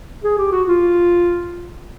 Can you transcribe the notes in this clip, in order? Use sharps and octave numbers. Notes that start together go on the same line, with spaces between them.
G#4
G4
F#4
F4